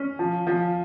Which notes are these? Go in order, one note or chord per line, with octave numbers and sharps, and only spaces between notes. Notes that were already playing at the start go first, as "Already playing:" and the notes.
Already playing: C#4
F3
F3